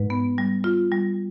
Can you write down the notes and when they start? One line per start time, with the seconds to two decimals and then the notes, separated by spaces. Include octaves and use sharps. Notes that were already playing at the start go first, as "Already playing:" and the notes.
Already playing: G#2 B4
0.10 B3
0.38 G3
0.64 F4
0.92 G3